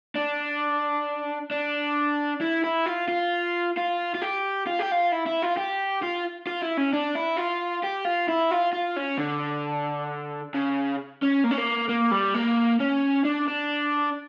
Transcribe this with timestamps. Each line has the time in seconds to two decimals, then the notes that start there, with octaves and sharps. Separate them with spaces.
0.16 D4
1.51 D4
2.41 E4
2.64 E4
2.86 F4
3.08 F4
3.77 F4
4.15 F4
4.21 G4
4.67 F4
4.80 G4
4.92 F4
5.12 E4
5.27 E4
5.43 F4
5.58 G4
6.03 F4
6.47 F4
6.62 E4
6.77 C#4
6.93 D4
7.16 E4
7.37 F4
7.84 G4
8.05 F4
8.28 E4
8.51 F4
8.73 F4
8.97 C#4
9.18 D3
10.55 C#3
11.22 C#4
11.44 A#3
11.51 C#4
11.58 A#3
11.89 A#3
12.11 G3
12.34 A#3
12.80 C#4
13.24 D4
13.48 D4